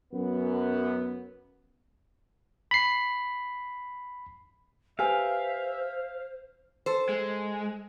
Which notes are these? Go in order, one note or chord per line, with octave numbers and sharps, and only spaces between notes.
F#2 B3
B5 C7
G4 B4 C5 E5 F5 G#5
A4 C5
G#3